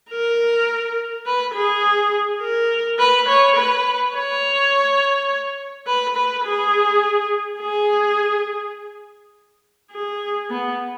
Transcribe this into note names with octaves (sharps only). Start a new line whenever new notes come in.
A#4
B4
G#4
A#4
B4
C#5
B4
C#5
B4
B4
G#4
G#4
G#4
B3